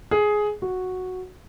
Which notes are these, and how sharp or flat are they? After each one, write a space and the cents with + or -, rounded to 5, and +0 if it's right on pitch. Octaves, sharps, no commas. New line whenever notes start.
G#4 +10
F#4 -5